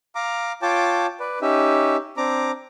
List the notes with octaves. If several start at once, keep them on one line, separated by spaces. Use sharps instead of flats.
F5 A#5 D6
F4 C#5 G5 A5 D6
B4 D5
C#4 D#4 G4 E5
C4 D4 A#5 D6